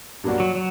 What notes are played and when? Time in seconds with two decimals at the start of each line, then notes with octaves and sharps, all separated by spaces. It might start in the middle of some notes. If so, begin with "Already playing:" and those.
0.24 G2 F#3 A#3 D4 F#4
0.40 F#3
0.55 F#3